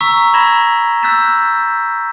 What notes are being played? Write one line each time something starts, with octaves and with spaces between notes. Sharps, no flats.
A#5 C#6 E6 B6
A#5 B5 G#6 A#6 E7 G7
E6 F#6 G6 A6 B6 E7